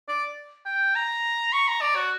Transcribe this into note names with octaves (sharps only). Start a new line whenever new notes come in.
D5
G5
A#5
C#6
A#5
D5
F#4